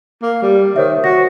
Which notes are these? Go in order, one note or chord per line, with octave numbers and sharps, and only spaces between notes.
A#3
G3
D#3 C5 C#5 E5
F#4 A#6